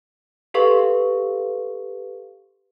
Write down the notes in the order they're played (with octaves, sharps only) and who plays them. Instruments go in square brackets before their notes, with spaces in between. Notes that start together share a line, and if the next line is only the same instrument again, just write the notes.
[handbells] G4 A4 B4 F5 C6 C#6